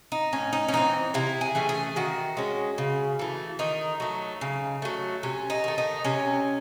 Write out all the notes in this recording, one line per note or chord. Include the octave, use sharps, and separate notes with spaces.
D#4
A2 C#4
D#4
C#4
E3 A3 C4 D#4
C3 E4
G#4
E3 A3 C#4
G#4
D#3 F#4
G#3 C#4
C#3
E3 A3
D#3 D#4
F#3 A3
C#3
F#3 A3
C3 C#4
D#4
D#3 A3
D#4
C3 C#4